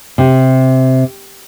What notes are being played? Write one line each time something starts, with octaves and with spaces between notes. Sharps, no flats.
C3